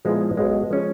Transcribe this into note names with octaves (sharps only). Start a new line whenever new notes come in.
A#2 F3 G#3 B3 E4
B1 B2 G#3
F3 G#3 C#4